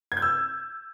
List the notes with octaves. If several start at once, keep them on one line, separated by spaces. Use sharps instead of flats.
G#6
G6
E6